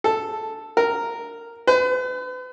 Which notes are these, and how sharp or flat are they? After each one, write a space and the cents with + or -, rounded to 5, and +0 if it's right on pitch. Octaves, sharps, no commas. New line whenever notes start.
A4 +0
A#4 -5
B4 +40